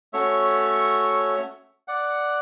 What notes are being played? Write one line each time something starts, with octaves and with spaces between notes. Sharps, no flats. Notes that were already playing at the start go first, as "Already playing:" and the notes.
A3 C#4 F#4 C#5 E5
D5 F#5